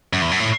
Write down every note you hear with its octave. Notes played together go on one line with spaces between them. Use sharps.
F#2
E2
F#2
A2